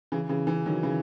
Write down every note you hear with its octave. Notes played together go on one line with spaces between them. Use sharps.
C#3 E3
C#3 E3
C#3 E3
D#3 F#3
C#3 E3